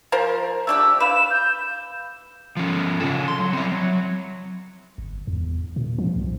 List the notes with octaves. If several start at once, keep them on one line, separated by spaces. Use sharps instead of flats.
F3 A#4 C5
A3 D4 G4 E6
B4 F5 E7
G6
F3 C#4
C#3 A4
C6
F#3
C4 E4
F#3
G1
E2
A#2
F3
C2